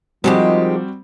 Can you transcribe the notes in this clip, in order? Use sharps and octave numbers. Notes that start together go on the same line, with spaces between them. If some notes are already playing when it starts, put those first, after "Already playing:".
D#3 F3 G3 G#3 C4 F#4 G4